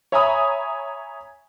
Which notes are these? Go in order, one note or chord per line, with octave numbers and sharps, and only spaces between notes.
C#5 E5 G#5 A#5 B5 D#6